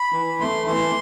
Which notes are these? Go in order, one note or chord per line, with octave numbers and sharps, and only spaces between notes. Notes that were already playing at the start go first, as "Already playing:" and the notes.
Already playing: B5
E3
A3 C6
E3 C6